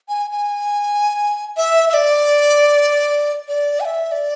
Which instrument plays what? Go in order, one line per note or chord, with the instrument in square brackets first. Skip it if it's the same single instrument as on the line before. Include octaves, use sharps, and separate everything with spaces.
[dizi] G#5
G#5
E5
E5
D5
D5
G#5
E5
D5